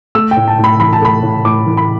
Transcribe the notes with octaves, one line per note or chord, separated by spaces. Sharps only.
A3 E6
G5
A2
A5
A2
B5
E3 B5
A5
A3 B5
A2
A2 D6
E3
B5